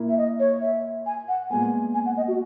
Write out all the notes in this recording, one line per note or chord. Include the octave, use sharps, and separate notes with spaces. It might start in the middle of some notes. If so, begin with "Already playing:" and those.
Already playing: A#2 A#3 E4
E5
D#5
C#5
E5
G#5
F#5
A#2 G#3 B3 G#5
G#5
F#5
D#5
F#4